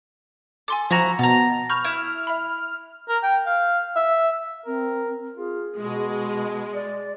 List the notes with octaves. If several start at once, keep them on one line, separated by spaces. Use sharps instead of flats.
A4 G#5 C6 D6
F3 E4 F#4 A#5
B2 F#5 A5 A#5
B5 C#6 F6 G6
E4
E5 B5
A#4
G5
F5
E5
C4 A#4
F4 G#4
B2 G#3
D5